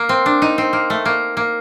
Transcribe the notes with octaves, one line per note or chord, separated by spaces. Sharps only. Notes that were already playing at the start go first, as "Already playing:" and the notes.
Already playing: A#3
C4
D4
D#4
C4
A#3
A3
A#3
A#3